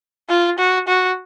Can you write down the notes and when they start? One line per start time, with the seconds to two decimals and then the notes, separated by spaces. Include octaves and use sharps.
0.29 F4
0.58 F#4
0.87 F#4